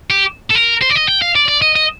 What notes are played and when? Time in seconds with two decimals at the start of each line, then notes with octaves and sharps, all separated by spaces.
0.10 G4
0.50 A4
0.55 A#4
0.81 C5
0.90 D5
0.95 D#5
1.08 G5
1.22 F5
1.36 D5
1.48 D5
1.62 D#5
1.76 D#5